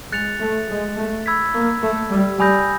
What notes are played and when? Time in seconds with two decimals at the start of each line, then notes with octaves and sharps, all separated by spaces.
0.12 G#3 F#6 A6 C#7 F7
0.40 A3
0.70 G#3
0.97 A3
1.26 B5 E6 G#6 B6
1.54 A#3
1.83 A3
2.11 G3
2.39 G3 G#5 B5 D#6 G6 A#6